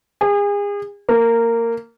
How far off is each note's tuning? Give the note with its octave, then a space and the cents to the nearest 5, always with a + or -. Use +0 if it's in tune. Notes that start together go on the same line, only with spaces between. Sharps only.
G#4 -35
A#3 -15